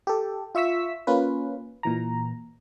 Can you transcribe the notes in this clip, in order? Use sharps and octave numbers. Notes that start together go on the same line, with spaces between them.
G4 A4
F4 E5 C#6 E6 B6
A#3 C#4 F4 B4
A#2 E3 A#5